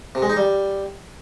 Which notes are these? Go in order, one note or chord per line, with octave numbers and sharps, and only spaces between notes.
C3
G#3
D#4
G3